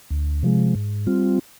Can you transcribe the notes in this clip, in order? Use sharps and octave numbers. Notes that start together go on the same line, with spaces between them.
D2
C3 F3 G#3
G#2
G3 C4 F4